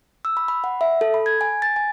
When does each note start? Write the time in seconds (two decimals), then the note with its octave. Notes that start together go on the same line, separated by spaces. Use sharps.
0.25 E6
0.37 B5
0.48 B5
0.64 F#5
0.81 E5
1.01 A4
1.14 B5
1.26 G#6
1.41 G#5
1.62 A6
1.76 G#5